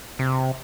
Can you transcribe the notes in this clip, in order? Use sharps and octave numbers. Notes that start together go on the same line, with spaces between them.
C3